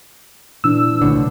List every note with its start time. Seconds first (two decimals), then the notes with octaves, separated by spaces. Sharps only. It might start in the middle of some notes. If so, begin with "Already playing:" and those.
0.64 A#2 E3 D4 E6
1.02 C2 A2 D3